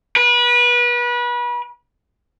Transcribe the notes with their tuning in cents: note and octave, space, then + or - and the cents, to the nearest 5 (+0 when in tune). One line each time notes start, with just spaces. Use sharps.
B4 -30